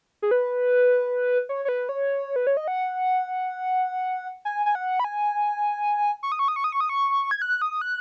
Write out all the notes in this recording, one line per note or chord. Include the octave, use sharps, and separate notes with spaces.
G#4
B4
C#5
C#5
B4
C#5
B4
C#5
D#5
F#5
G#5
G#5
F#5
B5
G#5
C#6
D#6
C#6
D#6
C#6
D#6
C#6
D#6
C#6
G#6
F#6
D#6
F#6